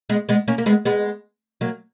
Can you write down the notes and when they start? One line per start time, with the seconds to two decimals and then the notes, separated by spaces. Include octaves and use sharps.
0.09 G#3 B3
0.29 G#3 B3
0.48 A#3 C#4
0.58 A#3
0.66 G#3 B3
0.85 G#3 B3
1.61 F#3 A#3